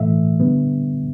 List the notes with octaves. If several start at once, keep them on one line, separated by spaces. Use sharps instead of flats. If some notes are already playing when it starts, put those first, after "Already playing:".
Already playing: A2 E3 A3 E5
D3 G3 B3